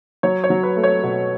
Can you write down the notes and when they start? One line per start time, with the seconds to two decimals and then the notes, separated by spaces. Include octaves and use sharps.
0.23 F#3 C#5
0.44 C#5
0.50 F#3
0.63 B4
0.77 A3
0.84 C#5
1.03 B2